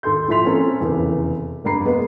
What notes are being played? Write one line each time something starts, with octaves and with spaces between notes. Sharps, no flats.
D#2 A4 C6 G6
A#2 F3 E4 C6 B6 F7
C4 C#4 A4 A#4
F1 E2 C#3
F1 G2 A#3 A#5 B5 C7
G#3 B3 B4